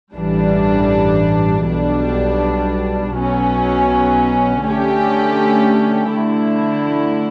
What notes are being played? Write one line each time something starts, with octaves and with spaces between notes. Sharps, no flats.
A1 G2 E3 G3 D4
B1 B2 G3 D4
B1 B2 F#3 C#4
D3 A3 C#4 G4
D3 A3 E4